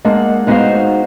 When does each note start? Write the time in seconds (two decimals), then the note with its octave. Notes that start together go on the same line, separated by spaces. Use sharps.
0.05 G#3 A#3 D4 F#5
0.47 G#3 B3 D#4 F#4 C5 F5